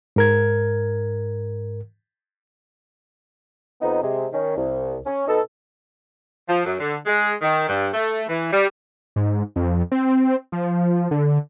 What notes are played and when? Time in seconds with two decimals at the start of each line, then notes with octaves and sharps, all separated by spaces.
0.16 G#2 A#4 G#6
3.82 F2 B3 D#4
4.02 C3 G#3
4.33 D#3 C#4
4.57 C2
5.06 C#4
5.28 B2 B3 D#4 A4
6.48 F3
6.66 F#2
6.80 D3
7.06 G#3
7.42 D#3
7.69 G2
7.94 A3
8.28 E3
8.53 G3
9.16 G#2
9.56 F2
9.92 C4
10.52 F3
11.11 D3